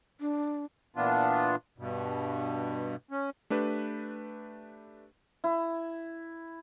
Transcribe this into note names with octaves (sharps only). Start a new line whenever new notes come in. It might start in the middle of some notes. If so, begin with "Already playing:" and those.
D4
A#2 E3 B3 D4 F4
G2 B2
C#4
A3 D4 G4 B4
E4